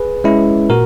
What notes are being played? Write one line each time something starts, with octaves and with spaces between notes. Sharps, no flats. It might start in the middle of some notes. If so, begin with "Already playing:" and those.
Already playing: G#4 B4
G#3 C#4 E4
A#2 F#4 A#4